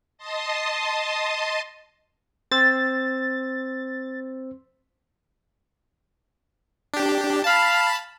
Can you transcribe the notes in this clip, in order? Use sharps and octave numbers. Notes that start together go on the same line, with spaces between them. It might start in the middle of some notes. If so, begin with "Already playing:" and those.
D#5 A5 C6 D#6
C4 C5 E6 A6
D4 G4
F5 A5 B5